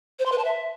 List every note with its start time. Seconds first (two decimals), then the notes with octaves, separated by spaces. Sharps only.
0.19 C5
0.26 C6
0.32 B4
0.38 A5
0.45 E5